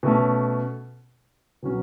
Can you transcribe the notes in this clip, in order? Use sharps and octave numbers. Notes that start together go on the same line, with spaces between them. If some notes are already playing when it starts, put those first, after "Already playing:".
B2 A3 C#4
B2 F#3 C#4